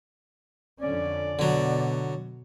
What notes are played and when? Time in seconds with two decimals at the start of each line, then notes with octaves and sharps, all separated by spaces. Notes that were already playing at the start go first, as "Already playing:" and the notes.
0.81 F2 D3 C#4 D5
1.39 B2 D3 F#3